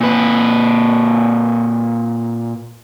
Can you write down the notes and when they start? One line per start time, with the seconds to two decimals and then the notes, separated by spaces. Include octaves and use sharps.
0.01 A#2 B4